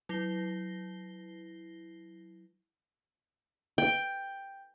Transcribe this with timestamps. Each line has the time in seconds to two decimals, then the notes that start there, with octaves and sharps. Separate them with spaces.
0.09 F#3 E4 A#6 C7 G7
3.78 G5